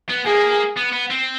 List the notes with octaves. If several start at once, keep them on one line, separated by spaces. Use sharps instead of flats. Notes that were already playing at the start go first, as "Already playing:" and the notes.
B3
A#3 G#4
B3
B3
C4